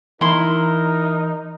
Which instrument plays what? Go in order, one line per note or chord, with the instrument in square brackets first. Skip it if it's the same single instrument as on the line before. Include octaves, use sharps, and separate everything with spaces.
[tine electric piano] E3 [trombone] D#4 [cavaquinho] E4 C6 [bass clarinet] A#4